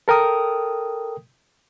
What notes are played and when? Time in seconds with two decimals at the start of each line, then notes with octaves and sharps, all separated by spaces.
0.08 A4 A#4 G5 D#6